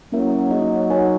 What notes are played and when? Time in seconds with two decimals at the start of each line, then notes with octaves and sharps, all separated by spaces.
0.12 F#3 A#3 C#4 E4 A#4 E5
0.51 A#3 D#4 G#4 D#5
0.90 D#4 A#4 C#5 G#5